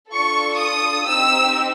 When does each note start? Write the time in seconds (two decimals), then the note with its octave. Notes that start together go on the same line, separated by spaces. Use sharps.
0.12 D4 F4 A4 C#6
0.59 D#6
1.07 C4 D#4 G4 E6